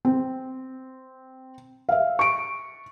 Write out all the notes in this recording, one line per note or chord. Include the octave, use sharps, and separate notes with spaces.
C4
E5 F5
C#6 D7